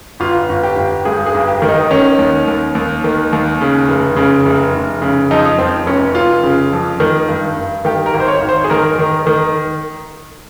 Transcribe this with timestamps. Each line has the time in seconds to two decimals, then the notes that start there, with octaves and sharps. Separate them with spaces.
0.20 G1 F4
0.49 G1
0.63 G4
0.77 G1
1.05 G2 G#4
1.26 G#4
1.34 G1
1.47 G4
1.62 D#3
1.69 D#4
1.91 D#3 C#4
2.19 D#2
2.48 D#2
2.75 D#2
3.04 D#3
3.33 D#2
3.61 C#3
3.88 F1
4.16 C#3
4.45 F1
4.74 F1
5.02 C#3
5.31 F2 D#4
5.58 F2 C4
5.86 F1 C#4
6.15 F1 F4
6.43 C#3
6.73 F2
7.00 D#3
7.29 G2
7.57 G2
7.85 D#3 G4
8.06 A#4
8.14 G#1
8.20 C5
8.28 C#5
8.42 G#1
8.49 C5
8.64 G#4
8.70 D#3 A#4
8.99 D#3
9.27 D#3